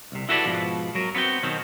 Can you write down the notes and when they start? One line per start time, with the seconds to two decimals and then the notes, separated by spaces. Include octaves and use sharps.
0.12 C2 C3
0.29 E4 F#4 A4 B4 C#5 D5
0.45 G#2 B2 F3
0.95 F#3 A#4
1.15 B3 C4 F#4 G5
1.43 B2 D#3 F#3 C4